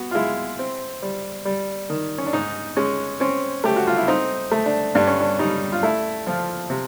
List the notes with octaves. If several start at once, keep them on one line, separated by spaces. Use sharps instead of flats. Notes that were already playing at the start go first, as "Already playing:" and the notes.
Already playing: B3 F#4
F4
G#3 E4
C4
G3
G3
D#3
C#4
D4
G#2 D#4
G#3 C#4
C4 C#4
A3 G4
F#4
F4
E4
C4 D#4
A3
D4
G2 D4
C#4
D4
G3 D#4
F4
A3 E4
F3 F4
C3